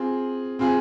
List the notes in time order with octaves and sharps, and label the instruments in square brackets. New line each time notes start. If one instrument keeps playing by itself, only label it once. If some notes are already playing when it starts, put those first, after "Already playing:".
Already playing: [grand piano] C4 F4 G#4
C4 F4 G#4